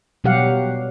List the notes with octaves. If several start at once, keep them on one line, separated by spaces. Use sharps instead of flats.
B2 F#3 G3 G4 F5 F#5